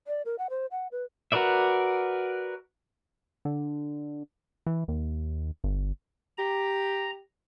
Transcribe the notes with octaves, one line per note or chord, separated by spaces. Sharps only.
D5
A#4
F#5
C5
F#5
B4
F#4 A#4 B4 D5 E5
D3
E3
D#2
G1
G4 A#5